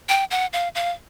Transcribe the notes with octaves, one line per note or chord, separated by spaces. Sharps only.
G5
F#5
F5
F5